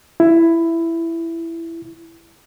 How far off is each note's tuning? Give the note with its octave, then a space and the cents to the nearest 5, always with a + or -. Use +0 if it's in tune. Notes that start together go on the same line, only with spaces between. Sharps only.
E4 +10